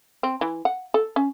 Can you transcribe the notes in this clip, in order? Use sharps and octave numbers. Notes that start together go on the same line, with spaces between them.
C4
E3
F#5
A4
C#4